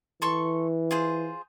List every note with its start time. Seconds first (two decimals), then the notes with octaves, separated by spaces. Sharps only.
0.22 E3 A4 C6 C#6
0.91 F4 G#4 C5